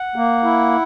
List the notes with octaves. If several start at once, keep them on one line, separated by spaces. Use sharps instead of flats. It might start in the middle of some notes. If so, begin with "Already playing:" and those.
Already playing: F#5
A#3
E4